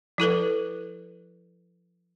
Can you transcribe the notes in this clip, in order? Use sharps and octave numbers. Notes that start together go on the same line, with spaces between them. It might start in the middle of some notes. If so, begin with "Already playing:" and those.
F3 E4 A4 B4